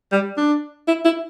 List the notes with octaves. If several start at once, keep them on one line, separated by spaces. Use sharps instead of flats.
G3
D4
E4
E4